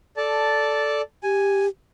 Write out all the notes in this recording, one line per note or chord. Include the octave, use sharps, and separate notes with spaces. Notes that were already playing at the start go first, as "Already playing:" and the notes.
A4 D5 A5
G4 G#5